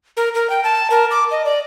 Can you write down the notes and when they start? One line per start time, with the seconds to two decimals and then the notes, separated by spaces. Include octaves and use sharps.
0.17 A#4
0.35 A#4
0.50 G5
0.64 A5
0.90 A#4
1.11 D6
1.31 D#5
1.45 D5